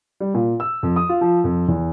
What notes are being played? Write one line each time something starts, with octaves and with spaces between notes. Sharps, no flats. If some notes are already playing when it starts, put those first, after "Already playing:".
G3
A#2
E6
F2
D#6
F4
F3
F2
E2